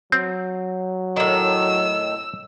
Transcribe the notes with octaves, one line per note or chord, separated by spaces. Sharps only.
F#3 C4
A2 D#3 E6